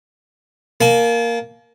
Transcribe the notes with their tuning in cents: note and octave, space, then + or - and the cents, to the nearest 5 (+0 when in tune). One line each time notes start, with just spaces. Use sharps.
A#3 +0 A5 -45